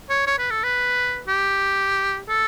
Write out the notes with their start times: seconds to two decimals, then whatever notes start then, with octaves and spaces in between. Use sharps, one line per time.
0.10 C#5
0.27 C#5
0.39 B4
0.50 A4
0.63 B4
1.28 G4
2.29 A4